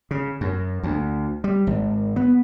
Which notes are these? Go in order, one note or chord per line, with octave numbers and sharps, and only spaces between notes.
C#3
F#2
D2
G3
G#1
B3